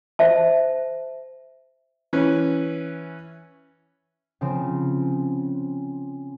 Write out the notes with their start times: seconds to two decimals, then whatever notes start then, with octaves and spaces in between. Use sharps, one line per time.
0.19 C5 E5 A5
2.13 E3 C#4 B4
4.41 C#3 F3 C4